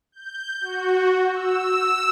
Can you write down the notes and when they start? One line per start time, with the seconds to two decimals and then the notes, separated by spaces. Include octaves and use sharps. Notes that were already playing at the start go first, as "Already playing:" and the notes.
0.12 G6
0.61 F#4
1.31 E6